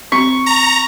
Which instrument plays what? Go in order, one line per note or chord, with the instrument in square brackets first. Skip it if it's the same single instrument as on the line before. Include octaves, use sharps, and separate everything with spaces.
[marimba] C4 [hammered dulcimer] C#6
[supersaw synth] A#5